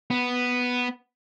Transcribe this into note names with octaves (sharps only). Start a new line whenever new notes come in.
B3